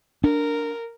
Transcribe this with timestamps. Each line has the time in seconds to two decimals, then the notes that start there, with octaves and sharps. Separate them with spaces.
0.24 D4 A#4